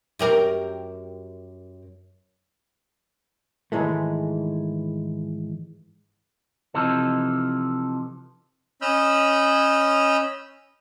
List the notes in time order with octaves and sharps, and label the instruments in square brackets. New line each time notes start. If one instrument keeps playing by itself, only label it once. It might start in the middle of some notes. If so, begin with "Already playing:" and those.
[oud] F#2 G4 A#4
[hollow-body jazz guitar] G#2 D#3 E3 G#3 A3
[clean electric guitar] C3 E3 F3 D#4 A4
[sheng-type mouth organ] C#4 D#5 B5 E6 F6 G6